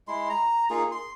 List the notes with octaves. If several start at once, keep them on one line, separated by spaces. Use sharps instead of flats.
G#3 E4 C6
A#5
A#3 D#4 F4 G#4
C6